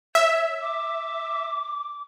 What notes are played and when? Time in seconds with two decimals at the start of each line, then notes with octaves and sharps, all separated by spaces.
0.15 C#5 E5
0.61 D6